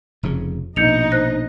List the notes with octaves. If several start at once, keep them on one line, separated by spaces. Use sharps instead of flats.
F1 F2 C#3
A#1 B2 D#4 D#5 G6 C#7 F7
C5 F#6 A#6